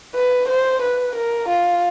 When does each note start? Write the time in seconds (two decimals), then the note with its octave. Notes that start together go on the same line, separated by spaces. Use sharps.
0.15 B4
0.48 C5
0.82 B4
1.15 A#4
1.49 F4